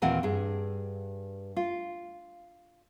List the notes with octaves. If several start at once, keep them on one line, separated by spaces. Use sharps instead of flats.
D#2 A#2 E3 C4 F#5 G#5
G2 G#4
F4